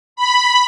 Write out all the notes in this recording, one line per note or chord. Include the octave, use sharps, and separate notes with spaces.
B5